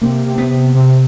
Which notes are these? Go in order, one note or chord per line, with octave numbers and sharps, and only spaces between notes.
C3 A#3
C3
B3
C3
C3